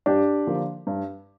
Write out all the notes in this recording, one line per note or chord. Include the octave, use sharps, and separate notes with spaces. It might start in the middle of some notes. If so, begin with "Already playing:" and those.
G2 D4 G4
D3 F3 A#3
G2